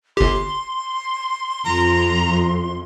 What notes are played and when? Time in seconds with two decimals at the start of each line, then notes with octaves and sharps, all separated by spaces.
0.17 G1 G4 C6
1.65 F2 A#5